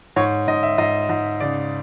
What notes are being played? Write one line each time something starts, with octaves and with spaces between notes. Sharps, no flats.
G#2 C#5
G#2 D#5
E5
G#2 D#5
G#2
C#3 D5